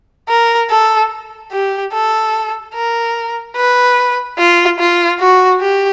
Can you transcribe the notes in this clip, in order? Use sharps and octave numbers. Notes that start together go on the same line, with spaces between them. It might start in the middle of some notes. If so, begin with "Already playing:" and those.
A#4
A4
G4
A4
A#4
B4
F4
F4
F#4
G4